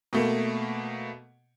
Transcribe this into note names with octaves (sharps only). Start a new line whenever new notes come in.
B2 A3 A#3